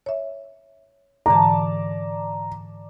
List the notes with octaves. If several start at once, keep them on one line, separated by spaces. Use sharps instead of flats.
C#5 E5
G#2 D3 E3 D5 A5 A#5